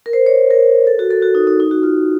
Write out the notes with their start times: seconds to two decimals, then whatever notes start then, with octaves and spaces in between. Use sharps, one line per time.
0.06 A#4
0.13 C5
0.26 C#5
0.51 A#4
0.87 A4
0.99 F#4
1.11 A4
1.22 F#4
1.35 D#4
1.47 D#4
1.60 D#4
1.71 F#4
1.83 F4